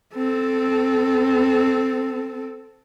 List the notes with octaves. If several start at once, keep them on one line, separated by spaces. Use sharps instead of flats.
C4 A4